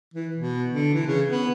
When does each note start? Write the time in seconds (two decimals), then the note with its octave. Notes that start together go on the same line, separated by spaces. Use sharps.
0.14 E3
0.36 B2
0.70 D3
0.94 E3
1.07 C#3
1.28 B3